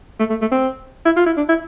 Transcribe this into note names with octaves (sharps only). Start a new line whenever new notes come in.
A3
A3
A3
C4
E4
F4
E4
D4
E4